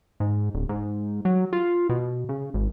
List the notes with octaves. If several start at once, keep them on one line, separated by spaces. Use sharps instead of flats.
G#2
D1
G#2
F#3
F4
B2
C#3
G#1